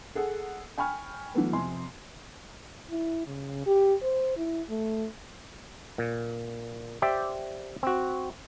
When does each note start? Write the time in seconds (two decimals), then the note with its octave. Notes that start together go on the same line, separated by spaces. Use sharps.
0.15 G#4 A4 F#5
0.78 G5 G#5 B5 C#6 F6
1.34 E3 F#3 A3 B3
1.53 F2 C3 G#5 C6
2.91 E4
3.26 C#3
3.66 G4
4.02 C5
4.37 E4
4.69 A3
5.98 A#2
7.02 G4 C5 D5 E5 G5
7.83 C4 F#4